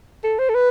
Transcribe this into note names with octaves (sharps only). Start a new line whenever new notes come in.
A4
C5
A4
B4